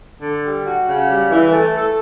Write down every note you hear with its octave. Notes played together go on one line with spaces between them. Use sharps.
D3
G3
F#4
C#3
G3
E3
A3
A4